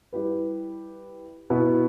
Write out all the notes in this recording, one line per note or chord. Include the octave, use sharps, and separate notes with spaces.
G3 E4 G4 B4
B2 B3 E4 B4